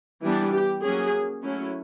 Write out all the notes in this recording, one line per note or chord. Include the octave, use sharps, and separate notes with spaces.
E3 G3 B3 D4
G4
F#3 A#3 C#4 G#4
F#3 A3 C#4 E4